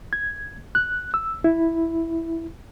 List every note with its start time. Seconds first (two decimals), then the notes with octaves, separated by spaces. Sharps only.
0.13 G#6
0.75 F#6
1.14 E6
1.44 E4